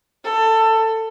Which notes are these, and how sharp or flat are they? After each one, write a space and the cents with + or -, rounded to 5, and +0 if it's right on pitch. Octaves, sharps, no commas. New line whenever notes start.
A4 +20